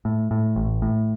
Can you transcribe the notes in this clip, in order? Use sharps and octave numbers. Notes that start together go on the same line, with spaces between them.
A2
A2
A1
A2